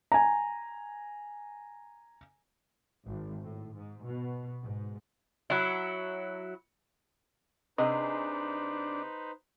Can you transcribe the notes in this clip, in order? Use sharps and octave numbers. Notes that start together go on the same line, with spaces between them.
G#5 A#5
G#1
A2
G#2
B2
G#2
F#3 E4
C3 D4 D#4 G#4 B4 C5 D#5